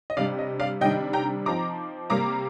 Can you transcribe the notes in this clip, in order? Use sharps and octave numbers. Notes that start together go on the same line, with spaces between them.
D#5
C3 G3 D4 D5 F5
D#5
D5 F5
C3 D#3 G3 D4 D#5 G5
G5 A#5
F3 C4 D#4 A#5 D6
C3 G3 A#3 A#5 D6